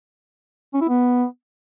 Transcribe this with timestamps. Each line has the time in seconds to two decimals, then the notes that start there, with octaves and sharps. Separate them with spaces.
0.74 C#4
0.81 E4
0.89 B3